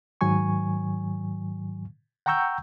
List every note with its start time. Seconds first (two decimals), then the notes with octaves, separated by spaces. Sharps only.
0.21 G#2 D#3 F#3 G#5 C#6
2.26 F#5 G5 A#5 C#6 E6 G6